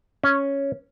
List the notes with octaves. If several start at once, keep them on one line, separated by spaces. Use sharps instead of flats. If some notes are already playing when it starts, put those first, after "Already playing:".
C#4